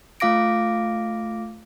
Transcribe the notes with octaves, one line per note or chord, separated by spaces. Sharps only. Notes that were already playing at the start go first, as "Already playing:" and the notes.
A3 F4 F5 D6 A#6 D7